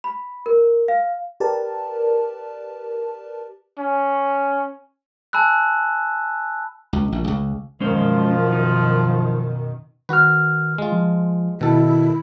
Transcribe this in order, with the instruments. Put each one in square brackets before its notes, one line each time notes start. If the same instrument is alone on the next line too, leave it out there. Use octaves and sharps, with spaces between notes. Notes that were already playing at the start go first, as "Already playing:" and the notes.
[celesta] B5
A#4
F5
[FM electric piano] G4 A#4 B4 D5 A5
[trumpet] C#4
[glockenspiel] G#5 A5 B5 E6 F#6
[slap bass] C#2
A#1
C#2
[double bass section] F#2 B2 D#3 [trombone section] F3 [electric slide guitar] G#3 C#4 C5
[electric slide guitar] D#4
[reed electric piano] D#3 F6 [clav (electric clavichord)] F#4 B4
[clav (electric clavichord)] G#3 F4
[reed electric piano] F3
[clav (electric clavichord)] B2 A4 [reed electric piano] D#3 [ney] E4